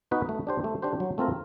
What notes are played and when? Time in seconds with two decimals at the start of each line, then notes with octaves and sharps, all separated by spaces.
0.11 B3 D#4 F#4 B4
0.29 A3
0.47 D4 G4 C5
0.64 A3
0.82 D4 G4 C5
1.00 F#3
1.18 A3 C4 F4 A#4